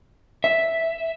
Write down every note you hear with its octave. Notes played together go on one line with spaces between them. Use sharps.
E5